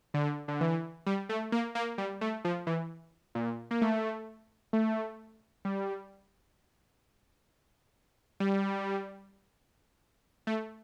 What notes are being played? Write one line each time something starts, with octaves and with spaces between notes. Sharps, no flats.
D3
D3
E3
G3
A3
A#3
A#3
G3
A3
F3
E3
A#2
A#3
A3
A3
G3
G3
A3